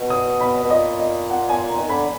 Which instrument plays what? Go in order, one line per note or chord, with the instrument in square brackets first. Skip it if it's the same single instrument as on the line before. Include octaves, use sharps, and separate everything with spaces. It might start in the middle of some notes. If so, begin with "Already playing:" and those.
Already playing: [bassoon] B2
[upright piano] D#6
B5
[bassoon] B2
[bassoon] A#2 [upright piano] D#5
[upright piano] D#5
F#5
G#5
A#5
[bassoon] D#3
[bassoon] D3 [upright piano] B5